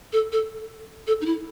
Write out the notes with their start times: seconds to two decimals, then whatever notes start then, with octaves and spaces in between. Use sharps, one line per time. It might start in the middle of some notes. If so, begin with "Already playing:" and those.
0.13 A4
0.32 A4
1.07 A4
1.21 D#4
1.26 E4